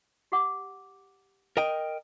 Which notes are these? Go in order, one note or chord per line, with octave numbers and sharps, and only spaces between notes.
G4 F#5 D6
A#4 D#5 G5